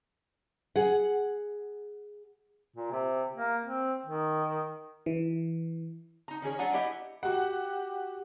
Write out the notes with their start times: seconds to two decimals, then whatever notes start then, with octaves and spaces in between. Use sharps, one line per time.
0.76 G#4 F#5
2.76 A#2
2.92 C3
3.36 A#3
3.66 C4
4.06 D#3
5.06 E3
6.28 D#4 A#5
6.42 D#3 C#4 G#4 C#5
6.59 F#3 D4 D5 F#5 G#5 A#5
6.73 E4 G4 D#5 E5 F#5
7.23 F#4 G4 F#5